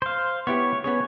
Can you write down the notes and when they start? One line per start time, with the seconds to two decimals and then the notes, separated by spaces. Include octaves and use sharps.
0.02 C5 F5
0.47 B3 E4 G4 C#5
0.84 B3 C#4 G#4 C#5